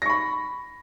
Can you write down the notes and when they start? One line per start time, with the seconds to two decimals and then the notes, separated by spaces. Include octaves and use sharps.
0.02 A#6
0.06 C#6
0.10 B5